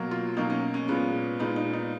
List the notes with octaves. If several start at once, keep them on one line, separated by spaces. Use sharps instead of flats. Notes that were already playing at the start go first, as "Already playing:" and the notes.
Already playing: B2 F#3 A#3
F4
B2 F#3 A#3 D#4
C#4
C#4
A#2 G#3 B3
A#2 G#3 B3 D#4
D#4
D#4